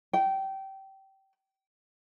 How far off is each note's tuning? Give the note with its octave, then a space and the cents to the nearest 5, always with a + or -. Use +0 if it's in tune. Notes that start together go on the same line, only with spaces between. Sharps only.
G5 -20